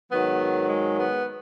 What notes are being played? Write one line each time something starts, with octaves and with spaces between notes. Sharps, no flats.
G#2 D#3 F#3 B3
G#3
B3